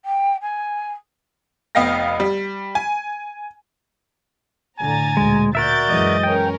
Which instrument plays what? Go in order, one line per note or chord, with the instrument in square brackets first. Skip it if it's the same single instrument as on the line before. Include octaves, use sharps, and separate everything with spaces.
[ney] G5
G#5
[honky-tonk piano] F1 B3 D#5 F5 G5 A#6
G3
G#5
[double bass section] A2 D3 [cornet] G#5 [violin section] A#5 A6
[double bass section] D2 A#2 [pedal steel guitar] G#3
[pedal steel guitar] F#4 A#4 E5 [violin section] D5 G6 A6
[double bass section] F#2 E3 G#3 [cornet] D#5
[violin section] C#4 A#4 [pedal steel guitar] G5